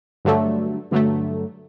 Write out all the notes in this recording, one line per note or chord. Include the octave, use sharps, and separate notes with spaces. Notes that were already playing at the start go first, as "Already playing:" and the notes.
G2 D3 F#3 A3
G2 D3 F#3 A3